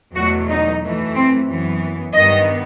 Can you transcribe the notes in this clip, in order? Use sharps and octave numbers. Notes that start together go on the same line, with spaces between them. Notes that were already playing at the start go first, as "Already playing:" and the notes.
E2 B2 F#3 A3 F#4
D#4
F#2 E3 A3
C4
F#2 E3 B3
G2 D#3 G3 B3 D#5